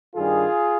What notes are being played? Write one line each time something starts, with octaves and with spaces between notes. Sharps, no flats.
G2 D#3 G3 F4 G#4